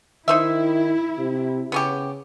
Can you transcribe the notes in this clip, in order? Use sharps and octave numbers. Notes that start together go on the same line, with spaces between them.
D#3 D#4 E4 C5 E5
C3
C#3 B3 C#4 G4